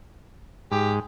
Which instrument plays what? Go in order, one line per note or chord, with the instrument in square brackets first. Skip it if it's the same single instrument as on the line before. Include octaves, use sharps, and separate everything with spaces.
[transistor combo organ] G#2 [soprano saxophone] G4